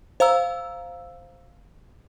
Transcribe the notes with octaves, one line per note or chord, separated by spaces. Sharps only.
C5 F5 A#5 E6